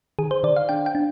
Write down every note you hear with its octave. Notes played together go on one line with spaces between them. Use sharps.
D#3 G#4
C5
D#3 D5
F5
D4 G5
G5
D4